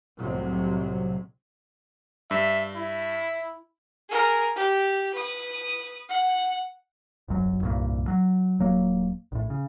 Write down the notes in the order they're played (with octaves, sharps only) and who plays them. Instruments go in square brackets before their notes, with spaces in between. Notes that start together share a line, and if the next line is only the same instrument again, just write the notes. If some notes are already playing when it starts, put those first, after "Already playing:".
[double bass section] C2 F2 A2 C3 F#3
[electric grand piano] G2 [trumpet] E5
[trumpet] E4
[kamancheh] G#4 A#4
G4
B4 D#6
F#5
[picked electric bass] D#1 G#1 F#2 F#3
F1 C2 G2 A#2
F#3
D#1 F#3 A#3
A#1 A2
C#3